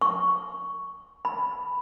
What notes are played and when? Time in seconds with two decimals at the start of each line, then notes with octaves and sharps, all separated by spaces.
0.01 C#6
1.25 B5